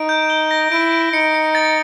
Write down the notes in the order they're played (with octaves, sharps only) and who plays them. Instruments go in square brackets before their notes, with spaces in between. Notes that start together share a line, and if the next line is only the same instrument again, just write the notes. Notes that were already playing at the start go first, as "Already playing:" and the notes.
Already playing: [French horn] D#4 [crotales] D7
[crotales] G6
G7
A#6
[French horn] E4 [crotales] D7
[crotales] D7
[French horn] D#4 [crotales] C#7
[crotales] C#7
A6